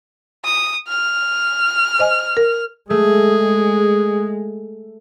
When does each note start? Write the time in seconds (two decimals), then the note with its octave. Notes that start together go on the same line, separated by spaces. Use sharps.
0.45 D#6
0.88 F6
1.99 C5 D#5 G#5
2.37 A#4
2.90 G#3 A3 G#4